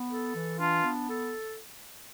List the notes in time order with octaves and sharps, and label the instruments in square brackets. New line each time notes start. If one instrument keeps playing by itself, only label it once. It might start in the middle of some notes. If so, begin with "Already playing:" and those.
Already playing: [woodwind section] B3
A4
E3
[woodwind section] D4 [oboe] F4
[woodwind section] B3
A4